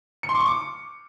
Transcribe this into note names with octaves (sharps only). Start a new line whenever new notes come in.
C#7
C6
D6
C#6
D6